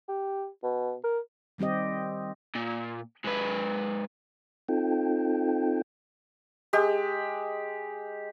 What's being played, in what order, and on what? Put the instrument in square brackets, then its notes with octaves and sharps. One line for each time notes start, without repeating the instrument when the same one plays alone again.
[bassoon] G4
B2
A#4
[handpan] D#3 G3 C4 G4 D#5
[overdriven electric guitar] A#2
G#2 B4
[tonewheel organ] C4 D#4 F4 A4 G5
[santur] G#3 G4